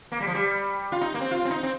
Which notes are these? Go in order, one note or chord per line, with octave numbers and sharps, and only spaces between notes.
A#3
G3
F3
G3
F4
D#4
A#3
C4
F4
C4
D#4
C4